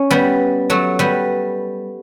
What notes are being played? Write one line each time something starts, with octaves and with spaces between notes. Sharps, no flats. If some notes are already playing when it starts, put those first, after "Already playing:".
Already playing: C#4
G3 B3
F#3 A3
G3 B3